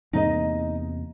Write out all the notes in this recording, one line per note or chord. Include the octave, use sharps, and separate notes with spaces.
E2 C3 A#3 D#4 D#5